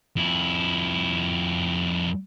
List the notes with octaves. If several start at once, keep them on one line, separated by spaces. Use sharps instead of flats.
F2 E4